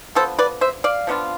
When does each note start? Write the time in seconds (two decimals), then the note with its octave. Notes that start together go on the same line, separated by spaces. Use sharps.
0.15 D3 F3 B3 A4 C5
0.39 B4 D5
0.61 C5 E5
0.84 D5 F5
1.07 F3 B3 D4 F4